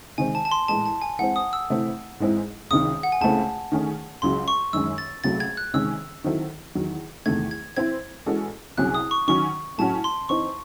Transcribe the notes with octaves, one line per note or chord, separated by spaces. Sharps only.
C3 D#3 G#3 C4 G#5
A5
A5
C6
A2 E3 G#3 A5
A5
G#5
E3 G#3 C4 F#5
D#6
E6
C3 E3 A3 C4 E4
G#2 E3 G#3 C4 E4
C#2 C3 D#3 D#6
F#5
G#5
C#2 C#3 E3 A3 C4 A5
D#3 A3 C#4 G#4
C#2 C#3 F#3 C6
C#6
F#2 D#3 G#3 C#4 E6
A6
C#2 C3 F#3 A3 A6
G#6
F#6
C3 D#3 G#3 C#4 E6
D#3 F#3 C4 E4 A4
E2 D#3 F#3
E2 C3 D#3 A3 G#6
G#6
E3 C4 E4 C5 G#6
E3 G#3 C#4 F#4 A4
C2 C3 F#3 C#4 G#4 F#6
D#6
C#6
D#3 F#3 C#4 C#6
A2 F#3 C#4 F#4 A5
C6
E3 C4 D#4 C#6